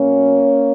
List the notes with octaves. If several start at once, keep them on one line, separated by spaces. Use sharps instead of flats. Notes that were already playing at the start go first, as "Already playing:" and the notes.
Already playing: B2 F#3 A#3 C#4